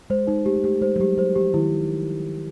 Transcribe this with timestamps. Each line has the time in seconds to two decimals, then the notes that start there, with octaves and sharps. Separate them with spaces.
0.10 G#3 C5
0.27 G#3 D#4
0.46 A3 G4
0.57 G#3
0.64 A3 G4
0.82 G#3 C5
0.96 F#3
1.00 G3 G4
1.18 F#3 C5
1.36 F3 G4
1.54 D#3 E4